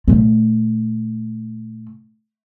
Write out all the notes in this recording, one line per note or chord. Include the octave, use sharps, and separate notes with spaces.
A#2 A3